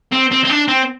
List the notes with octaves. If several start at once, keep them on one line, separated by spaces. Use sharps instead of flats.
C4
C4
C4
D4
C4